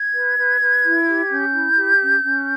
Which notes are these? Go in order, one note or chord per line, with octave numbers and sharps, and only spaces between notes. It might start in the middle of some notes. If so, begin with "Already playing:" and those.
Already playing: G#6
B4
B4
B4
E4
G4
C#4 G6
E4
G4
C#4
C#4